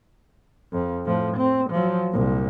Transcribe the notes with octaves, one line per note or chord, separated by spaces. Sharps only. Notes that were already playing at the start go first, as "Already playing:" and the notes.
F2
A2 F3
C4
F3 F#3
C2 A#2